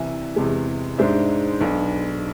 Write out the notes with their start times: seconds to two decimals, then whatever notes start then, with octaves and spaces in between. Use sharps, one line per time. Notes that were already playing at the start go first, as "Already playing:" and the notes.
Already playing: C2 C3 E3 E5 G#5
0.36 E2 C3 G#3
0.98 G#2 G#3 D4 C5 E5
1.61 B1 B2 B3 D4